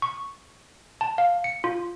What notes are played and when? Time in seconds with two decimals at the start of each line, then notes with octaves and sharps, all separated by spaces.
0.02 C#6
1.01 A5
1.18 F5
1.44 C#7
1.64 F4